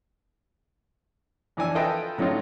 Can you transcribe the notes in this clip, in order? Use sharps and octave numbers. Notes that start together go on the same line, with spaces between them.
F2 E3 D4 G#5 E6
F4 A4 B4 D#5 E5 G5
A2 F#3 C#4 D#4 F4